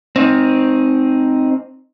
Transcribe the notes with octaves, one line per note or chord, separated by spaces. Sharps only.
C4 D#4